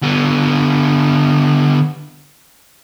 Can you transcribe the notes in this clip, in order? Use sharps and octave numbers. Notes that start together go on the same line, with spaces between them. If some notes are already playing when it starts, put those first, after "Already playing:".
D3 B3